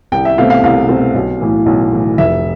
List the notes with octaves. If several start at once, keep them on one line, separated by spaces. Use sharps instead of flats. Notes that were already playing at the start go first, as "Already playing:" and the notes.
C2 G5
E5
B2 A3 C4 F5
F5
C2 F5
B2 A3 C4
B1
A2 E3
B1
A2 E3
F1 E5